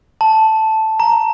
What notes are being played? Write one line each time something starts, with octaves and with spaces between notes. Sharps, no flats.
A5
A#5